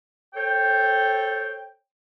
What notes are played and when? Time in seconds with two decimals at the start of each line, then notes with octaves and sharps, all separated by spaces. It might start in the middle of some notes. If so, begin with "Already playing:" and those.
0.34 A4 C5 C#5 G5